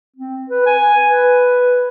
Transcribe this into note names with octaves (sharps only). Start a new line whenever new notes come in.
C4
B4
G#5
B4